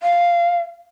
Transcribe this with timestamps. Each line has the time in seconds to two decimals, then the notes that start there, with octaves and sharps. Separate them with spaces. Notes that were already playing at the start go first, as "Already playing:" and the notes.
0.02 F5